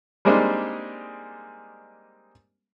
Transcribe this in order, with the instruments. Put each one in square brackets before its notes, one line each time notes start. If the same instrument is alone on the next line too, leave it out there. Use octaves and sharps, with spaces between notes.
[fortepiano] G3 G#3 A#3 C4 D4 D#4